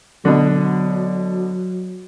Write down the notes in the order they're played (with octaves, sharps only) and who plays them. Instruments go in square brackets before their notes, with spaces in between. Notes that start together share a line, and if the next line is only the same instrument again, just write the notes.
[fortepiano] B2 D3 [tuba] F#3